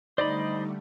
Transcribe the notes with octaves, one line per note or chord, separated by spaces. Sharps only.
D3 G3 A3 D#4 C5 D5 D#5 B5